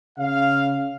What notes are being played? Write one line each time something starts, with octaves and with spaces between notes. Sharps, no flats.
C#3 F5